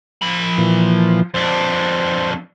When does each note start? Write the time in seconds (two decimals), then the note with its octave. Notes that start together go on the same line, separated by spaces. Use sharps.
0.22 F3 B5
0.58 A#2 E3
1.34 F2 D4 C5